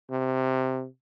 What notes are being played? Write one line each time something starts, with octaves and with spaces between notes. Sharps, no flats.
C3